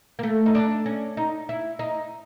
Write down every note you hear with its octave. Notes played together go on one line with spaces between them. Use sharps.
A#3
A3
D#4
D4
C#4
D#4
E4
D#4